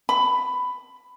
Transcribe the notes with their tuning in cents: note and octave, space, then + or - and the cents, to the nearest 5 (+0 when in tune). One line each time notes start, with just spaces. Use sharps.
B5 +15